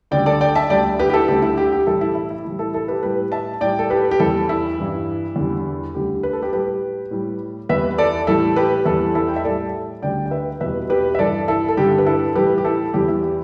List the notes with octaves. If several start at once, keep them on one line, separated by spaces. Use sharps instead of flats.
D2 D3 G3 D5 G5
A4 D5
D5 G5
E5 A5
D2 D3 G3 D5 G5
G4 B4
G4
E4 A4
D2 D3 G3 G4
E4
G4
G4
A2 E3 G3 E4 A4
E4
E4
E4
A2 E3 G3
E4 A4
E4 A4
G4 B4
A2 G3 G4 B4
E5 A5
A2 G3 D5 G5
A4
G4 B4
G4
E2 E3 G3 E4 A4
E4
G2 E3 G3
E2 D3 G3
D2 D3 G3 G4
B4
A4
G4 B4
A2 G3 G4 B4
A2 G3
E2 E3 G3 B4 E5
A4 D5
A2 E3 G3 E4 A4
G4 B4
E2 E3 G3 E4 A4
E4 A4
G5
E5
A2 G3 A4 D5
D2 D3 G3 D5 G5
G5
B4 E5
E2 B2 G3 B4 E5
G4 B4
E5
G2 E3 G3 A4 D5
E4 A4
A4
G2 D3 G3 G4
B4
E4 A4
A2 E3 G3 G4 B4
G4
E4 A4
E2 E3 G3 G4
E4
G4